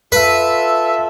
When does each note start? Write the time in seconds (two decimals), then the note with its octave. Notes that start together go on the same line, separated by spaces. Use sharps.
0.12 F4 A4 B4 E5